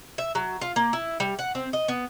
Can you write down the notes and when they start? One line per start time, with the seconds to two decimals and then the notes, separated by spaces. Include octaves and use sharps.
0.18 E5
0.35 F#3
0.61 F4
0.76 A#3
0.93 E4
1.20 G3
1.39 F#5
1.55 C4
1.73 D#5
1.88 B3